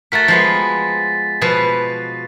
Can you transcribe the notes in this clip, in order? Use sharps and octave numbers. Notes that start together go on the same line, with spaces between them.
A3 F#4 A#4 A6 B6
F3 G#3 B3
B2 F3 B4